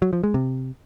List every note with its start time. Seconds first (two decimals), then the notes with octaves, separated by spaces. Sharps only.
0.02 F#3
0.13 F3
0.23 G#3
0.34 C3